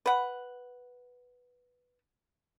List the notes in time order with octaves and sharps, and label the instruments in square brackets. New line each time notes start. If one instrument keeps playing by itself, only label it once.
[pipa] B4 F#5